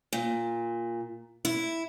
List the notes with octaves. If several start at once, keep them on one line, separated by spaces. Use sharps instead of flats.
A#2
E4